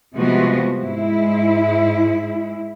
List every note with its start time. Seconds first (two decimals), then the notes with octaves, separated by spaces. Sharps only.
0.15 C3 F3 G3 G#3 B3 F#4
0.80 G#2 G#3 E4